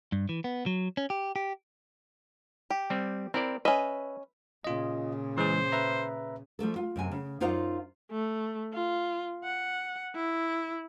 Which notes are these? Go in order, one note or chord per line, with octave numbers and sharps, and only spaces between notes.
G2
E3
B3
F#3
C#4
G4
G4
G4
G3 C4
C4 E4 A#4 D5
C#4 B4 D#5 E5
A#2 C#3 F4 D#5
E3 G#3 G#4 C5
B4 E5 A#5
F3 G3 A3 A4
F4
F#2 C3 G#5
C#3
F#2 D#4 F4 C5 D5 F5
A3
F4
F#5
E4